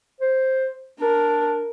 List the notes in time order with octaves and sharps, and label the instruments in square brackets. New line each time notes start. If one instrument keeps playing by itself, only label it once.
[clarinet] C5
[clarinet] D4 [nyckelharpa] A#4